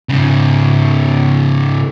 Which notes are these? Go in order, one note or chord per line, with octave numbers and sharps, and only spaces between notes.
G#2 C#3